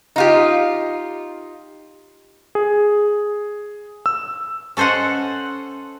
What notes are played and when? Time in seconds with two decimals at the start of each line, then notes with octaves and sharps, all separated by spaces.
0.16 D#4 F4 G4
2.55 G#4
4.06 E6
4.77 C#4 A4 C5 D#5 F#5